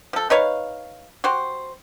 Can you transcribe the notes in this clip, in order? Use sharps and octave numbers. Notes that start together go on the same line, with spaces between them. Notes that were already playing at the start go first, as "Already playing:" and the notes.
F3 A4
D#4 B4 C#5 F5
F#4 G4 C5